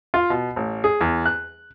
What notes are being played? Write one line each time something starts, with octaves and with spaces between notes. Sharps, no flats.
F4
B2
A1
G#4
E2
F#6